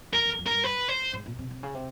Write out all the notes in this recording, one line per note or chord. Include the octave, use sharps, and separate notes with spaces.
F2 A#4
E2
F2
G2 A#4
B4
C5
G#2
A#2
C3
C3
C#3
C3